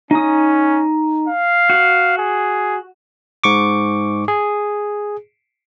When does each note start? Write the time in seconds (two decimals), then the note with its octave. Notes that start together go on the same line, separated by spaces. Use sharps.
0.11 C#4 D#4 D#6
1.28 F5
1.70 F#4
2.18 G#4
3.44 G#2 C#6 D6
4.28 G#4